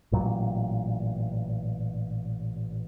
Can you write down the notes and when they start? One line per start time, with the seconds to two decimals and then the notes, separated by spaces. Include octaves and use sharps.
0.12 A1 A#2 F#3